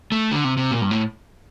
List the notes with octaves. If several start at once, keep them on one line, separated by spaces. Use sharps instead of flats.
A3
D3
C3
C3
A#2
G2
A2